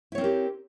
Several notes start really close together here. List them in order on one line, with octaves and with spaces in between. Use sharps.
E4 C#5 C4 A#4 G4